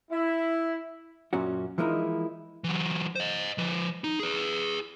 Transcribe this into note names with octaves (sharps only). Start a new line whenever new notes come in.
E4
F#2 A#2 C#4 F#4
E3 F3 G#3 A#3 D#4 E4
E3 F#3
C5 D#5
F3 B4
D#4
G#4 B4